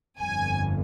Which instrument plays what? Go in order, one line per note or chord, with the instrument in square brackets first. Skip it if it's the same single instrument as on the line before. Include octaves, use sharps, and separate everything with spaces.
[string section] G1 F2 G#5